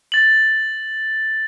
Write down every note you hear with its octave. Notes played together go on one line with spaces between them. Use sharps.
A6 F#7